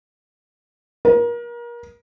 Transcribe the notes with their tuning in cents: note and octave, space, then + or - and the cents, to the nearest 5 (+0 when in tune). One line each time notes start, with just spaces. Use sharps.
A#4 +30